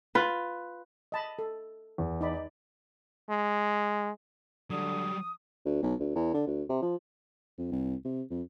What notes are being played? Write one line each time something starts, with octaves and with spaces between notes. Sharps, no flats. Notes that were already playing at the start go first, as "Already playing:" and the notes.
F4 B4
D#5 A5 B5
A4
E2
D#4 D5 B5
G#3
D3 F#3 G3 D#6
D2
B1
D2
E2
D3
D2
C3
F3
F2
C2
C3
F2